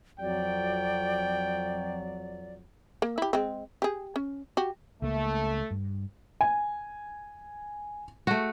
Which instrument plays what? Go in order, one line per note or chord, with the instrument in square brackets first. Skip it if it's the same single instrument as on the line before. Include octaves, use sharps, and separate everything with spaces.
[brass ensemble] F2 F#3 [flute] D5 [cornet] G5
[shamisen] A#3
E4 G4
G#3 C4
G4 G#4
C#4
F#4 G4
[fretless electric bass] C#2 A#3 [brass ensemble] A3
[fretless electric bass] G2
[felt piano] G#5
[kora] A3 F#4